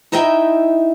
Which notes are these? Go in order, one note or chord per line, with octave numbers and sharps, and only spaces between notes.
D#4 E4 D#5 E5 G5